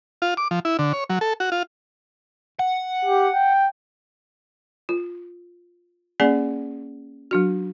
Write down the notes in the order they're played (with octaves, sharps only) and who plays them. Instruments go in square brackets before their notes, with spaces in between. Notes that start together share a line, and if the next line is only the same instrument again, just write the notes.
[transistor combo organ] F4
D6
F3
E4
D3
C#5
F#3
A4
F#4
F4
[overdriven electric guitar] F#5
[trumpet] G4
G5
[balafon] F4
A#3 C#4 G#4 D5 F#5 G#5
F#3 D4 F#4